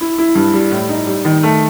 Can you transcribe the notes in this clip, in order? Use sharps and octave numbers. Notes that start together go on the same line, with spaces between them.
E4
E4
G2
G3
A2
D#4
G3
D#3
A3